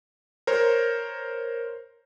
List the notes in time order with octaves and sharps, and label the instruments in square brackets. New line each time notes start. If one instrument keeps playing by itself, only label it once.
[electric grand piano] A#4 C5 C#5